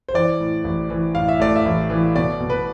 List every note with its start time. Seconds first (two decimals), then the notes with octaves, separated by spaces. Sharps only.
0.09 C5
0.14 E3 D5
0.40 A2
0.64 A1
0.90 E3
1.15 A2 F5
1.29 E5
1.40 A3 D5
1.56 E5
1.65 A1
1.90 E3
2.15 B2 D5
2.40 B2
2.50 B4